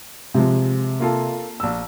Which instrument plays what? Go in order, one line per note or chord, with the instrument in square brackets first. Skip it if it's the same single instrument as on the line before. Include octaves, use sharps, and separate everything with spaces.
[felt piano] C3 [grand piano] F3 G#3
[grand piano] A#3 F4 A4
A#1 E6